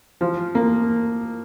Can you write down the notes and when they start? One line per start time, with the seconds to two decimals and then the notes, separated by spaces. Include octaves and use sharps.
0.21 F3
0.55 A#3